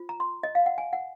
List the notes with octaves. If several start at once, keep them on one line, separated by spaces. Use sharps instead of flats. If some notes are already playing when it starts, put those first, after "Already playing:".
Already playing: F4 C5
A#5
C6
D#5
F5
F#5
G#5
F#5